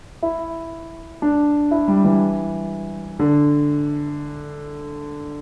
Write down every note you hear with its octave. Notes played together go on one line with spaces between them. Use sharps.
E4
D4
E4
G3
E3
D3